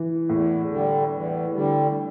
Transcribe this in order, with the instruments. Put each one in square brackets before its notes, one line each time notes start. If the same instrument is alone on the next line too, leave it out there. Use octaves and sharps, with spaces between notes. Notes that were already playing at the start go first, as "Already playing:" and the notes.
Already playing: [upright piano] E3
[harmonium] E2 [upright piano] A2
[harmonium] D3 G3
E2
D3 G3